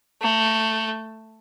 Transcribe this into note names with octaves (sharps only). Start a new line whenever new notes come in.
A3